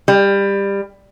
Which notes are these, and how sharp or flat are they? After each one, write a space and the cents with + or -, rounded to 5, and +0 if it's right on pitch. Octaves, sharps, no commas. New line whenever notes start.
G3 +20